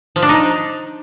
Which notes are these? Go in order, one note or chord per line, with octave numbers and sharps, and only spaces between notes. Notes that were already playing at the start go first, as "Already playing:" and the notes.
F3
D4
D#4